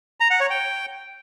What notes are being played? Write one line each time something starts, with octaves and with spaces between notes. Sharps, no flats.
A#5
F#5
C#5
G5